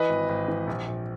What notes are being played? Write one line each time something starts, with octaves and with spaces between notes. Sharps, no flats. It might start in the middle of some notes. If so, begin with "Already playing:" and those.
Already playing: E3 B4 D#5
G#1
G#1
E3
A#1
A#1